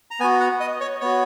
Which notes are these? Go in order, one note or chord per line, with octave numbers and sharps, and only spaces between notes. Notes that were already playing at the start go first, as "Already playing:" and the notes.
A#5
B3 F#4 G#5
F#5
D#5
C#5
B3 F#4 C#5